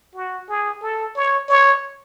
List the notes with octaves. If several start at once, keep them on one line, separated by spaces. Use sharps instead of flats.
F#4
G#4
A4
C#5
C#5